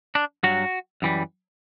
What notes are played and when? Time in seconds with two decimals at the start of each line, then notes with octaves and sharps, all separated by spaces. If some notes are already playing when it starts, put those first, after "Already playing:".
0.15 D4
0.43 G2 F#3 F#4
1.02 F#2 E3 G3